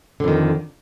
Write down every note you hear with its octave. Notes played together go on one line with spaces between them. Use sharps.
F2 D3 D#3